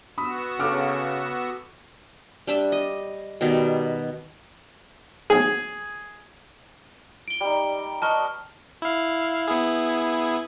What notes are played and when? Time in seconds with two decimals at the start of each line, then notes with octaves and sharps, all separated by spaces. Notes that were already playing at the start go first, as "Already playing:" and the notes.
0.18 B3 F#4 B5 D#6 E6
0.60 C#3 A4 D6 F6
2.47 G3 D4 E5
2.72 D#5
3.41 B2 D#3 G3
5.30 G#4
7.28 D7 G7
7.41 G3 D#4
8.02 B4 D#5 A5 C#6 F6 G7
8.82 E4 F5
9.48 B3 E4 G#4